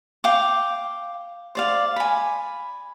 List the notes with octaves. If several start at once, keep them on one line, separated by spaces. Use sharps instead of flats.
F5 G5 D6
C5 D5 F5
G#5 B5